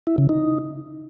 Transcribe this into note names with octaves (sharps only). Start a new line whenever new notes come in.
E4
C#3
D#4